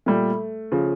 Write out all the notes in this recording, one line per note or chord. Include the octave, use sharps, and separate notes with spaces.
A#2 G3 A3
C#3 F3